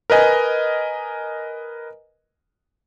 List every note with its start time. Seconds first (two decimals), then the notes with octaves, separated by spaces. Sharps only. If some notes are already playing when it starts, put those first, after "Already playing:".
0.10 A#4 B4 D#5 G#5